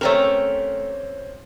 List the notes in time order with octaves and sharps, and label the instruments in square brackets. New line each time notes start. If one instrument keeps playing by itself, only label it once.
[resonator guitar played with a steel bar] A3 G4 A#4 [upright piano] C4 C#4